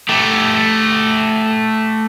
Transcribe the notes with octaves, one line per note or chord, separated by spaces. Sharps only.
A3 G4